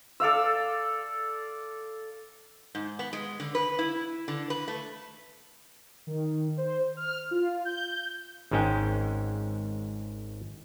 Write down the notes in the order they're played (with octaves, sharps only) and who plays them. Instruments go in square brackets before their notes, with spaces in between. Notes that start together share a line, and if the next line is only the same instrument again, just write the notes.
[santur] A4 D5 F5 E6
[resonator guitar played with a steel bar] G#2
B3
G#3
D3
B4
E4
D3
B4
A3
[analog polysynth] D#3
C5
F6
F4
G6
[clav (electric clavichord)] G#1 G#2 G#3 C#4 G5